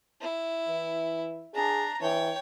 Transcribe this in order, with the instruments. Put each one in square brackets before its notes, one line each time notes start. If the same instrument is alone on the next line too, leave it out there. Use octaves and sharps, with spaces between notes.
[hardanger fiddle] E4
[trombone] E3
[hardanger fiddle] D4 A#5 [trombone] G#4
[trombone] E3 [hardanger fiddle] C#5 G5